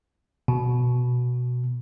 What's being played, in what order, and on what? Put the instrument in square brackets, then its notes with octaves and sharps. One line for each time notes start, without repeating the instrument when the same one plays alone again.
[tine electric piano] B2